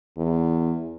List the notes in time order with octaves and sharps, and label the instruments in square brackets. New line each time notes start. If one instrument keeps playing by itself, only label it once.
[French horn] E2